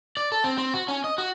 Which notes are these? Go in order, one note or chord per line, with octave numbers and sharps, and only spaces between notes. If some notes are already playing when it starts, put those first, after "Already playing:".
D5
A4
C4
C4
F#4
C#4
D#5
F#4